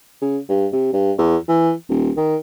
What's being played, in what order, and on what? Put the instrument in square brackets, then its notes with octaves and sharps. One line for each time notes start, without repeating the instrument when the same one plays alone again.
[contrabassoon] C#3
G2
C3
G2
E2
E3
D#1
D#3